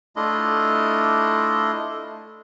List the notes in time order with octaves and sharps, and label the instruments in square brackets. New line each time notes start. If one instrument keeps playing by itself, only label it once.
[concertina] A3 D4 E4 F4 D#5